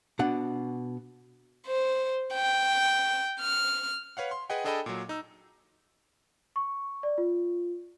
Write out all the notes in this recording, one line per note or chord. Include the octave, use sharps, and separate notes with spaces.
B2 D4 F#5
C5
G5
F6
B4 C#5 F5 F#5
C6
G#4 B4 D#5 F#5 G5
D4 G#4 A4 D#5 G5 B5
A#2 F#3
D#4 E6
C#6
D5
F4